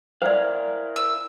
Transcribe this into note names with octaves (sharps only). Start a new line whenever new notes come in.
E4 A#4 C5 D5 F5
E6